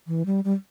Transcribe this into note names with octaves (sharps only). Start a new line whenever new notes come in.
E3
G3
G3